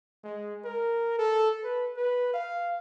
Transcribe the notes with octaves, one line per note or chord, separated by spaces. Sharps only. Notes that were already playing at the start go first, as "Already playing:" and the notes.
G#3
A#4
A4
B4
B4
F5